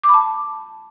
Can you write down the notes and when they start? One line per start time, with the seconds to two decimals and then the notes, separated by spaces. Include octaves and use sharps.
0.03 D6
0.09 B5
0.14 A5